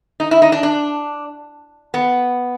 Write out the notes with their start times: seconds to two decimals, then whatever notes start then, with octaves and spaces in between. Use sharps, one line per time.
0.20 D#4
0.31 E4
0.42 D#4
0.52 D4
0.63 D4
1.94 B3